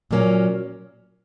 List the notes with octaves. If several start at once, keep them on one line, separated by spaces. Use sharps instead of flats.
A#2 F#3 A#3 C#4